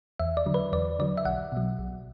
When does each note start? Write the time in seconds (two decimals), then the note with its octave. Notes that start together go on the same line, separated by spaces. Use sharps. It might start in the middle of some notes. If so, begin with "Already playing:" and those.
0.20 E2 E5
0.37 D5
0.46 D3 F#3
0.54 B4
0.73 E2 D5
0.99 D3 F#3 D5
1.18 E5
1.25 B1 F#5
1.52 B2 F#3
1.79 B1